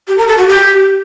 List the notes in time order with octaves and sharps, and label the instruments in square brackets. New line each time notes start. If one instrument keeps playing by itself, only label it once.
[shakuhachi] G4
A#4
A4
F#4
G4